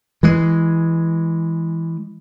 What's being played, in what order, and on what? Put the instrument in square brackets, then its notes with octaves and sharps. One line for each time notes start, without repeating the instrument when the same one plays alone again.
[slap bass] E3 G#3